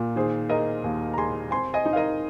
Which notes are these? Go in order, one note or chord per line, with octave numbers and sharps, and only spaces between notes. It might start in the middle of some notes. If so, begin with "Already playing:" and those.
Already playing: A#2
D#3 G#4 C5
G#4 A#4 D#5
D#2
A#5
G#4 G#5 C6
C4 G#5 C6
D#5 G#5
D#4
F5
A#4 D#5